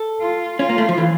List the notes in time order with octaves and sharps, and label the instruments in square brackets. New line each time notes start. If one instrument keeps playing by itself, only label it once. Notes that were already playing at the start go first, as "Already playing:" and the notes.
Already playing: [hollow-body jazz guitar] A4
[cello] F4
[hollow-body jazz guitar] C#4 [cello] F4
[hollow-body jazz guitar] A#3
A3
F3
E3